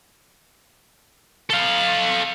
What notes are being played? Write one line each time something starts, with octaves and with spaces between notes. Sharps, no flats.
A4 F5